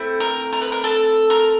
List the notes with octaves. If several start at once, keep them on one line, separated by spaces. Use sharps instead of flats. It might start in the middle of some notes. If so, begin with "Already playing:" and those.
Already playing: A3 C4 E4
A#4
A#4
B4
A#4
A4
A#4